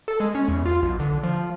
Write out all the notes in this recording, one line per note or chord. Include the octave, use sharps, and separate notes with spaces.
A4
G#3
C#4
E2
F4
B1
D3
F3